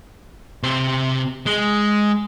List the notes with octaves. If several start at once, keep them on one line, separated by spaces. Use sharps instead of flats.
C3 C5
G#3